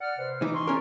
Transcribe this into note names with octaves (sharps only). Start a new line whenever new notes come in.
D5 F#5 F6
C3 B4 C5
E3 D#4 D6
C6 C#6
C#4 G#4 A#4 D5